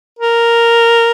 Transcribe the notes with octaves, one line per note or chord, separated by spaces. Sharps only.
A#4